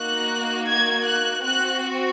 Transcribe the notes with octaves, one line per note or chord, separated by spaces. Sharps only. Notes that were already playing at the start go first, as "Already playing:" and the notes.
Already playing: A#3 D#4 F#4 F#6
G#6
F#6
C4 F#4 F#6